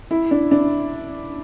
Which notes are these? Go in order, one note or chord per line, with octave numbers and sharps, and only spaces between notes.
E4
D4
D4